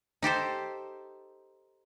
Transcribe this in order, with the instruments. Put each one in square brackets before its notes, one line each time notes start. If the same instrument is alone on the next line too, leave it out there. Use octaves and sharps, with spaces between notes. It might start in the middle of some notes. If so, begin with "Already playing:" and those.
[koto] D#4 G4 A4 C5